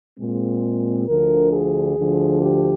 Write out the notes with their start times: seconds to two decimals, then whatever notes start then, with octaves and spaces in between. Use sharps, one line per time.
0.19 A#2 G#3 C4
1.07 D2 D3 F3 A#4
1.52 G#4
1.97 D2 D3 F3
2.42 G4